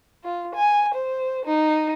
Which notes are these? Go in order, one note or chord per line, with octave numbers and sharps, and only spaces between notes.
F4
G#5
C5
D#4